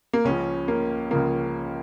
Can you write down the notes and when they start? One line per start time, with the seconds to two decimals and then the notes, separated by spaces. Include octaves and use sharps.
0.13 A#3
0.24 C#2 C#3 F3 C#4
0.68 A#3
1.11 C#2 C#3 F3 A#3